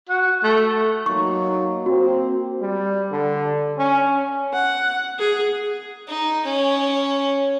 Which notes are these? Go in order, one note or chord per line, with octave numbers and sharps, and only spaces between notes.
F#4
A3
F#3 A#3 D#4 C#6
A#3 C4 F#4
G3
D3
C#4
F#5
G#4
D#4
C#4